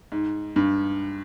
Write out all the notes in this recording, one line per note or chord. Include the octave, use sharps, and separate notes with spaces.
G#2
G2